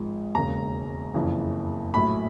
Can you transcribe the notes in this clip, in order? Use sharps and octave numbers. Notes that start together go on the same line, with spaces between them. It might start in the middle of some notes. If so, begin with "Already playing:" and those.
Already playing: G#1 G#2 F3 G#3
E1 D#2 C#3 A#5
F#1 F2 C#3 E3
A#1 A2 F#3 B5